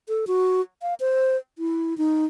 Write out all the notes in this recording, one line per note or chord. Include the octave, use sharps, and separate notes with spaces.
A4
F#4
F5
C5
E4
D#4